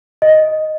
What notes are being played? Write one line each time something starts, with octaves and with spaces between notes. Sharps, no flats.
D#5